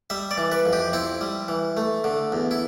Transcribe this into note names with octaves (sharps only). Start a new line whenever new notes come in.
G3 E5
D5
E3
B4
F2
G4
C4 E4
G3
E3
A3
D3
E2
E4